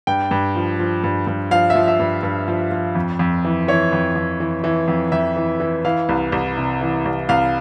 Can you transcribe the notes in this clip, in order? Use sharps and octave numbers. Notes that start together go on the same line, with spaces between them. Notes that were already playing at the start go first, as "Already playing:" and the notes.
G2 G5
G2
F3
F3
G2
G2
F3 F5
E5
F3
E5
G2
G2
F3
F3
F2
F2
E3
E3 C#5
F2
F2
E3
E3
F2
F2 E5
E3
E3
E3 F5
C2
C2
C3
E3
C2
C2 F5